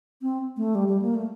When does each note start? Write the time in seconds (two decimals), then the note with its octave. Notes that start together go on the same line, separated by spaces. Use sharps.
0.22 C4
0.57 A3
0.75 G3
0.88 G3
1.02 A#3
1.15 A3